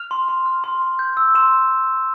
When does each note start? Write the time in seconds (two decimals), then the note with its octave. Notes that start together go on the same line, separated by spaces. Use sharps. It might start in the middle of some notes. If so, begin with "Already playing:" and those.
Already playing: F6 F7
0.11 C6
0.28 C6
0.46 F6
0.64 C6
0.82 C6
0.99 G6
1.17 E6
1.35 C6 E7